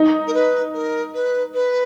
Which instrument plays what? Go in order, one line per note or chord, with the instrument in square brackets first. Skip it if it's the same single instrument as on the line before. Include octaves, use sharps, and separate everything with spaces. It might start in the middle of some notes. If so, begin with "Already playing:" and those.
Already playing: [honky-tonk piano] D#4
[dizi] A#4
B4
A#4
B4
B4